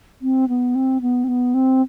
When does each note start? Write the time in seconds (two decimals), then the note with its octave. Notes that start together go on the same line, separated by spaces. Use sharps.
0.22 C4
0.48 B3
0.75 C4
1.01 B3
1.24 C4
1.28 B3
1.54 C4